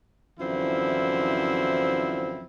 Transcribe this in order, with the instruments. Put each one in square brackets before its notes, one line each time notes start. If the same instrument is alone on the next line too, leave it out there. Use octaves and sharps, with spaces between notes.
[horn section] F#2 D3 E3 F3 C4 E4